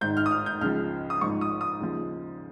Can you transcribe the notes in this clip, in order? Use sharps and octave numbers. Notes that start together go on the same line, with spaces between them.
G#1 G#2 D#3 G6
F6
D#6
F6
G6
C#2 C#3 F3 F6
D#6
G#1 G#2 F3 C#6
D#6
D#6
D#2 C#3 F3